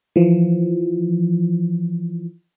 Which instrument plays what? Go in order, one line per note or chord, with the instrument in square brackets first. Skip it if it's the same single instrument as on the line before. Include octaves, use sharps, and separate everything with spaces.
[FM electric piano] E3 F3